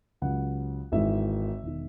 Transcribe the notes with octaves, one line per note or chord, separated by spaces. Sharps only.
C#2 C#3 F#3 C#4 F#5
G#1 G#2 E3 G#3 E5
E1 D#3